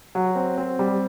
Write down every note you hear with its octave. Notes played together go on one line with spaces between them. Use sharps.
F#3
C4
C4
G3